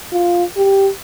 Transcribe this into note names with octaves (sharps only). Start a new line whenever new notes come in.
F4
G4